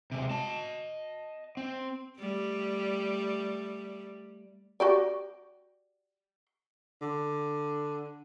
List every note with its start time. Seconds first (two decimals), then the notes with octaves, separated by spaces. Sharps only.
0.12 C3 G#3
0.30 D#5 A5
1.57 C4
2.19 G3 A3
4.80 F#4 G4 D5
7.02 D3